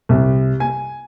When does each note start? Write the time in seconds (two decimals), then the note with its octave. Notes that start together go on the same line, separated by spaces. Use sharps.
0.09 C2
0.60 G#5